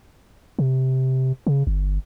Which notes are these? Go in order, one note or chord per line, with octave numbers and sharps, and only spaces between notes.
C3
C#3
G1